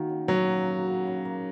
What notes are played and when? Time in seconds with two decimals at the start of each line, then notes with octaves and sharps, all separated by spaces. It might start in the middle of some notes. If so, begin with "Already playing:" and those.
Already playing: D#3 A#3 F#4
0.09 C#3
0.28 C#3 F#3
0.48 A#3
0.67 F#4
0.86 C#3
1.07 C#3
1.25 A#3